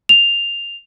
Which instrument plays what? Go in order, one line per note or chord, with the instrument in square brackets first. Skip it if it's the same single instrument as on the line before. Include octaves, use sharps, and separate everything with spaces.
[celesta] F7